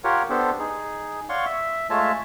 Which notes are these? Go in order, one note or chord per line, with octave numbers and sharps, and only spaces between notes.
F4 G4 A#4 C#5 F#5
B3 D4 G4 A4 C5
D#4 G#4
C#5 D5 F5 F#5 C6 C#6
E5
G#3 A3 F4 C#5 E5 A5